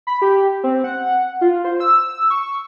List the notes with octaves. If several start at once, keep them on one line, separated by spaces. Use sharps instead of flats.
B5
G4
C4
F#5
F4
C5
E6
C#6